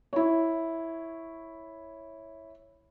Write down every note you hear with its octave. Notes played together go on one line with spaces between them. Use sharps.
E4 C#5